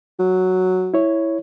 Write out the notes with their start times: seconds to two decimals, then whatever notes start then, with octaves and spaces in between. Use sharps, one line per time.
0.19 F#3
0.94 E4 C#5